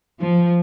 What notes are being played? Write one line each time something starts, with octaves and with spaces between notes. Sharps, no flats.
F3